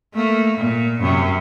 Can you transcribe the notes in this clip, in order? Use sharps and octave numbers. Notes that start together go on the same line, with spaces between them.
A3 A#3
A#2
F#2 C3